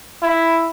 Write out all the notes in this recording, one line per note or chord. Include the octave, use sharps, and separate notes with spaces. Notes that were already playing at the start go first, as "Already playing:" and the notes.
E4